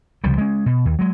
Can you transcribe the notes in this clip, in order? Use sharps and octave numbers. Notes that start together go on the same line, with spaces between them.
C#2 C3 F3 G3
G#3 C#4
B2
D#2
F#3 G#3